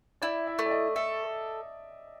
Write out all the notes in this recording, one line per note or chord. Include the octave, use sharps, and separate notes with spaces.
E4 D5
E5
A3
D5
D#5
A4 E5